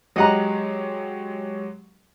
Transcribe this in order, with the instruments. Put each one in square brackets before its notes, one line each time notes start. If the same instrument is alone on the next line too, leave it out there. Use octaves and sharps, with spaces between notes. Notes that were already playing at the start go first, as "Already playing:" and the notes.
[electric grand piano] F#3 G#3 G4 [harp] D#5 F#5 A#5